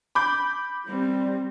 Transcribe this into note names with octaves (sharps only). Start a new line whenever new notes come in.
B5 D6 G6
G3 C4